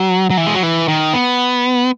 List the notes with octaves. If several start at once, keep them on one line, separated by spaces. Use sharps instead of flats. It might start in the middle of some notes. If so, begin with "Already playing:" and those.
Already playing: F#3
F#3
E3
G#3
F#3
E3
D#3
B3